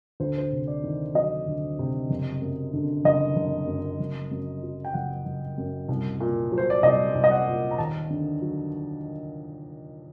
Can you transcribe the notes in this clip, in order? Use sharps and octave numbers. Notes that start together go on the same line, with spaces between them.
D2 C5
C5
C3
D5
D#3
F#3 D#5
D2
C3
F#1
F#2
D3
F#1 D#5
F#1
F#2
F#1
F#2
F#3
G5
F#1 F#5
F#1
F#2
C2
A#2
F#3
C5
D5
C2 D#5
C2
D#5
F#5
A#2
A#5
D#2 A5
D3
F#3